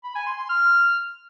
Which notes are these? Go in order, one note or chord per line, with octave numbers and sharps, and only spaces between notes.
B5
G#5
C6
C6
F6